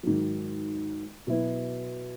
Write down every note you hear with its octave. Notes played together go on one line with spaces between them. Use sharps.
G#2 D#3 F#3
B2 F#3 B3 E4